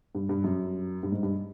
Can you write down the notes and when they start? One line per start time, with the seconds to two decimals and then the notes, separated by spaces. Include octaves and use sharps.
0.15 G2
0.29 G2
0.44 F#2
1.03 G2
1.12 G#2
1.23 G2